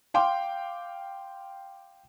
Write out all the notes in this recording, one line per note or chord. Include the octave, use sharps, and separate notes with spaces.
F5 G5 C6 D6